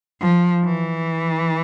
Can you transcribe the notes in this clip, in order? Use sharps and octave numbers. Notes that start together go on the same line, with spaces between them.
F3
E3